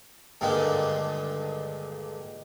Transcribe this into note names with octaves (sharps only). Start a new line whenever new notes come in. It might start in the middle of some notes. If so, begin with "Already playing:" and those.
G2 A#2 D3 D#3 G#3